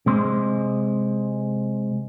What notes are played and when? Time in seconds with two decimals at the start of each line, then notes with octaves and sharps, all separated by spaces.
0.06 C3 G#3 C6